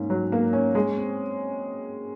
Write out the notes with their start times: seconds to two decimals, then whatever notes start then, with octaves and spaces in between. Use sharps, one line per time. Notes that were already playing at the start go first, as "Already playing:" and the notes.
Already playing: G#2 A#3 C#4
0.10 F#3
0.32 A#3
0.53 C#4
0.75 G#3
0.97 C4